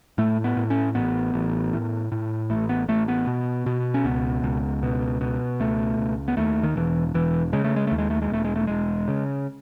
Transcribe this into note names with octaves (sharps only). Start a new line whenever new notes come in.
A2 A3
B3
A2
C#4
A1 B3
A1
A2
A2
A1 A3
B3
A1 A3
B3
B2
B2
C#4
C#2 B3
C#2
B2
B2
C#2 A3
C#2
B3
D#2 A3
D#3
E1 E3
E1 E3
C#3 G#3
A3
G#3
D#2 A3
G#3
A3
G#3
E1 A3
G#3
A3
E1 G#3
C#3